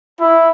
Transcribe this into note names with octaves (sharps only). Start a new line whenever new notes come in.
E4